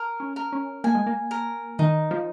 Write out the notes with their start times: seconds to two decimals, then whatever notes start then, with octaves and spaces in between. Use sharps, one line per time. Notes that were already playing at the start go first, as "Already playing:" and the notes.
Already playing: A#4
0.20 C#4
0.36 A#4
0.52 C#4
0.84 A#3 G#5
0.95 G#3
1.07 A#3
1.31 A#4
1.79 D#3 D#4
2.11 F3